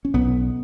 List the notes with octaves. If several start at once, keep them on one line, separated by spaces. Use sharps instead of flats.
C#4
B1 B3